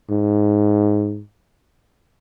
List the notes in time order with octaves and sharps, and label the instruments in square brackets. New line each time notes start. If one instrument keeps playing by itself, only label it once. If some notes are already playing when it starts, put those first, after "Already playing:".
[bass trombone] G#2